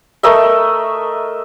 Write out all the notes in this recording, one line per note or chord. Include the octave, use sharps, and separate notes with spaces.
A3 A#4 D#5 E5